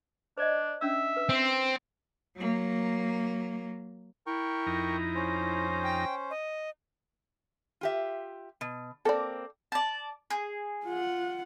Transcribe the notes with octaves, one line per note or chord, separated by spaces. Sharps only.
D4 C5 D5 D#5
C#4 D4 E5 E6
B4
C4
F#3 A#3
E4 A#4 G5 C#6
F2 D#4 A#5
C#4 C5
G5
D#5
F4 G4 E5
B2
A#3 C4 A4 D5
D5 A5
G#4
F4 F#5